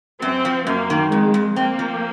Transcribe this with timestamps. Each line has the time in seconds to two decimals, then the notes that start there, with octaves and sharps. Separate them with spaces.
0.22 F#2 C4
0.45 F3
0.67 F#2 A#3
0.90 D#3
1.12 F2 G#3
1.34 F2
1.56 A#3 C4
1.79 F3